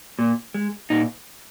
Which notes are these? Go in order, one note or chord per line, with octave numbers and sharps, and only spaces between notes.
A#2
G#3
A#2 D#4